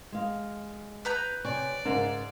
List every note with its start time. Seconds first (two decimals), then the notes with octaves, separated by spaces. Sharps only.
0.12 G#3 F5
1.05 B4 A#5 G6
1.44 C3 C#5 D5 G#5
1.85 G#2 C#3 A#4